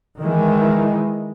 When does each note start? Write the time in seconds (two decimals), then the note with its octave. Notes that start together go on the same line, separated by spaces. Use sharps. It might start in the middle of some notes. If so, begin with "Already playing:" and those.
0.19 D#3 E3 G#3